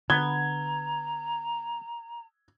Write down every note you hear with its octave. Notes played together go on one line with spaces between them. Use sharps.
D3 B3 A#5 G#6 G7